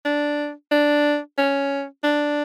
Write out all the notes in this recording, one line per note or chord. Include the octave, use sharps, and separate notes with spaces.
D4
D4
C#4
D4